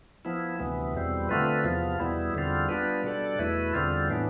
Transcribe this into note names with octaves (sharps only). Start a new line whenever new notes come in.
F3 B3 E4
D2 C3 E3 B3
E2 B2 G3 C4
D3 A3 C4 F4 B4
E2 C3 F3 B3 F4
E2 B2 G3 B3 E4
E2 D3 G3 C4 F4
G3 B3 D4 F4 B4
B2 G3 D4 A4 D5
E2 B2 A3 E4 B4
E2 D3 G3 C4 F4
A2 E3 B3 D4